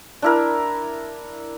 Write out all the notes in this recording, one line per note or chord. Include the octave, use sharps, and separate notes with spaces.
D4 E4 A#4